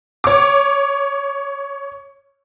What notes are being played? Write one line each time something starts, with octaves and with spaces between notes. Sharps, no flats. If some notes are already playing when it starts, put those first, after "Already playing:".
C#5 D6